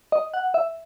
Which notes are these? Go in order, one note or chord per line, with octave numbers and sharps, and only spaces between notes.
D#5
F#5
E5